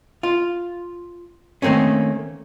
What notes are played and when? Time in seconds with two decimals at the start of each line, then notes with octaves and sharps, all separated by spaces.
0.23 F4
1.62 D#3 A3 A#3 C4 C#4